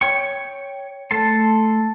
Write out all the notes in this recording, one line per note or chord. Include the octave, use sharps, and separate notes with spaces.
C#5 G5 C#6
A3 A4 A5 C6